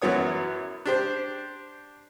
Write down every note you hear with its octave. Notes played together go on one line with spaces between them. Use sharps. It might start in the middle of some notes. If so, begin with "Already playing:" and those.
F#2 E3 F#3 B3 C#5 D#6
D4 G4 C5